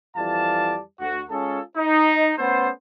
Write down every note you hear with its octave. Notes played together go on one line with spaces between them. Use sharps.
F2 E3 G3 D5 F5 A5
D2 F#4
G#3 C#4 F4 G#4 A4
D#4
A3 B3 C#4 A4 C5